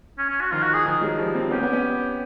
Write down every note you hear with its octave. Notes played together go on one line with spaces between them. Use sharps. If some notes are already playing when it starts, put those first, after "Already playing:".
C#4
C#4
F#4
D#3 F3 F4
F#4
G#4
D#3 F3
F#3 G#3
F3 G3
A#3 C4
B3 C#4 G4
B3 C#4
B3 C#4